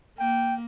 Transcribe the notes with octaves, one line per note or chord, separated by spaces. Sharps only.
A#3 G5